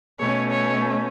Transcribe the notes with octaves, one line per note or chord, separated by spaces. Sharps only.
B2 A3 C#4 C#5
C#5